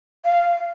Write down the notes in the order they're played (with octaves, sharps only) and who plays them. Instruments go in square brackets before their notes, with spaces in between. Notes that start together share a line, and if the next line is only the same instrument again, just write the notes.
[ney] F5